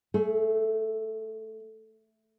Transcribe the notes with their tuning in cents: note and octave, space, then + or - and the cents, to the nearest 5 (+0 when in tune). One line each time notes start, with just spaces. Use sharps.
A3 +0 G#4 +40